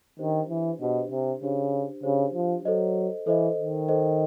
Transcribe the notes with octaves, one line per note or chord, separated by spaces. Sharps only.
D#3 D4 G4 C5
E3
B2 D4 G4 C5
C3
C#3 D4 G4 C5
C#3 D4 G4 C5
F3
F#3 A4 C5 D#5
E3 A4 C5 D#5
D#3
A4 C5 D#5